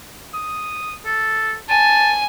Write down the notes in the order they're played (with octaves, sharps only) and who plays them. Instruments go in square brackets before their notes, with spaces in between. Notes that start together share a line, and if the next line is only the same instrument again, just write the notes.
[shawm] D#6
A4
[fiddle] G#5 [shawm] A5